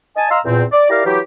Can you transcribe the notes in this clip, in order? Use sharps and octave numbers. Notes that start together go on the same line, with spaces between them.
D#5 G#5 A5
D#5 F5 A#5 C6 E6
E2 A#2 C4
D5
E4 G4 A#4 D5 F5 A#5
E3 F#3 E4 G4